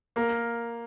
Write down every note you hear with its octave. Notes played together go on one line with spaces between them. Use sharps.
A#3 A#4